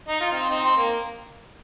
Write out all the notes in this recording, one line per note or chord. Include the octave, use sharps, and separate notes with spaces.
D#4
F4
C4 D#4
C4 D#4
C4
A#3